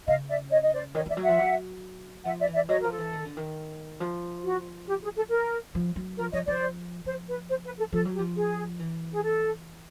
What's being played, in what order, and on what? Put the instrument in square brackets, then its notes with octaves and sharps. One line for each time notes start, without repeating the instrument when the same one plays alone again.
[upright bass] C#3 [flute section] D#5 F5
[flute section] D5 E5
C#5 D#5
D#5
C5 D5
[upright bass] D#3 [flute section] C#5 D#5
[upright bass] E3 [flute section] D5 E5
[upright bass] F#3
[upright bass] F3 [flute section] E5 F#5
[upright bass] F#3
[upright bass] F3 [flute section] E5 F#5
[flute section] D5 E5
[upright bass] E3
[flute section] D5 E5
[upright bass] F#3 [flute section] C#5 D#5
[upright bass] F3 [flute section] A#4
[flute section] A4
[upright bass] E3
D#3
D3
D#3
F3
[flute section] F#4
G4
G#4
A4
A#4
[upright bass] F3
F#3
[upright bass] F3 [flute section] A#4
[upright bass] F3 [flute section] C#5 D#5
[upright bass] F3 [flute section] C5 D5
[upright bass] F3 [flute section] C5
[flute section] B4
C5
B4
A4
[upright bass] F3 [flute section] A4
[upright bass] F#3
[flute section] G4
[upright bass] F3
[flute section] G#4
[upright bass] E3
[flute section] G#4
A4